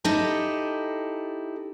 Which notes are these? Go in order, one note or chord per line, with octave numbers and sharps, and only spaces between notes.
D#4 E4 G4 A4